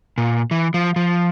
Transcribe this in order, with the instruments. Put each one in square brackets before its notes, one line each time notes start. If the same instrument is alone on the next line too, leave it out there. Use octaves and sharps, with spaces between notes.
[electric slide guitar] A#2
E3
F3
F3